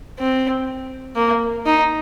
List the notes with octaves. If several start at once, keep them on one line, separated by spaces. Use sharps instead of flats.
C4
A#3
D#4